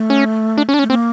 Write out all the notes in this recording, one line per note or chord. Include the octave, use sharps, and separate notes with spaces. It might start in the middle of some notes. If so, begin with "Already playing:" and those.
Already playing: A3
C#4
D4
C#4
D4
C#4
A3
A#3 C4